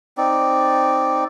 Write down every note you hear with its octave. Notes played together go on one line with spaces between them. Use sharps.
C4 D#4 D5